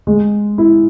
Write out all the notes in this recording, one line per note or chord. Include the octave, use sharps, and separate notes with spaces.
G#3
E4